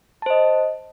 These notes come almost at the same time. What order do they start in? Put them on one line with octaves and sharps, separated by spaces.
A5 C5 D#5